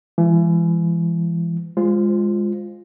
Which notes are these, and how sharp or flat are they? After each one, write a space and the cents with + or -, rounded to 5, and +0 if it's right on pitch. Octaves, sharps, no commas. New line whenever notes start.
E3 +35 G#3 -15
G#3 -15 F4 +0 C5 +0